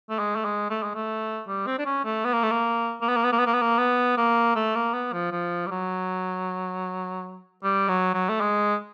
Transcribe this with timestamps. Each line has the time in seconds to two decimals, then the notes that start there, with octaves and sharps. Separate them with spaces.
0.10 A3
0.19 G#3
0.36 A3
0.45 G#3
0.70 A3
0.83 G#3
0.95 A3
1.48 G3
1.67 C4
1.78 D4
1.86 C#4
2.05 A3
2.25 B3
2.33 A#3
2.43 A3
2.51 A#3
3.01 A#3
3.08 B3
3.16 A#3
3.24 B3
3.32 A#3
3.39 B3
3.46 A#3
3.54 B3
3.62 A#3
3.78 B3
4.17 A#3
4.55 A3
4.75 A#3
4.93 B3
5.13 F3
5.32 F3
5.66 G3
5.71 F#3
7.63 G3
7.88 F#3
8.14 F#3
8.29 A3
8.41 G#3